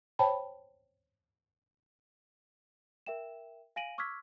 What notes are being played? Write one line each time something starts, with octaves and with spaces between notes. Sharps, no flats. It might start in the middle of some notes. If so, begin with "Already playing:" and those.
C5 C#5 G5 A5 B5
A#4 E5 G5 E7
F5 G#5 A#6 D7 D#7 F#7
C#6 D6 E6 F6 G#6 B6